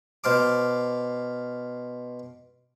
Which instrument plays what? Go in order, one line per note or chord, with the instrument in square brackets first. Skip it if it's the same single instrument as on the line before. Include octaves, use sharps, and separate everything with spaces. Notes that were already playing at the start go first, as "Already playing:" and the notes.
[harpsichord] B2 C5 F5 A5 D6